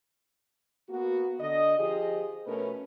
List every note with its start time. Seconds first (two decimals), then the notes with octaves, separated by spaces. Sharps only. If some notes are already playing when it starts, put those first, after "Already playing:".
0.89 A#3 B3 F#4
1.40 D3 D#5
1.78 F3 F4 G4 G#4 D#5
2.46 B2 A3 C#4 A#4 B4